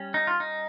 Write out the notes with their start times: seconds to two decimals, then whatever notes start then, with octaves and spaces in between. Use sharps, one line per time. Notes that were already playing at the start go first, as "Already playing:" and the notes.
Already playing: G3 C#4
0.14 D#4
0.27 F4
0.40 D#4